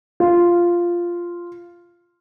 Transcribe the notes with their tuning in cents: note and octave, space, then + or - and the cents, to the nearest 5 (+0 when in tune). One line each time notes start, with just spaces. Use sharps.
F4 -5